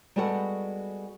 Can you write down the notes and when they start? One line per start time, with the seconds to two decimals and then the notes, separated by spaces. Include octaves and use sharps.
0.16 G3 G#3 B3 F#4 A4 F#5